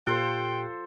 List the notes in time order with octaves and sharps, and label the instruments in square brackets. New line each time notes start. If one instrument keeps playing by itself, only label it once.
[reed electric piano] A#2 G4 F#6 [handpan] F4 [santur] A4 C5 C6 [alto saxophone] G5